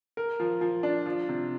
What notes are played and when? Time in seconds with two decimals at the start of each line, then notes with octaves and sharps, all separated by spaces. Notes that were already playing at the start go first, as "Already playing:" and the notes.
0.17 A#4
0.40 F3
0.61 F3
0.83 D4
1.06 F3
1.29 C3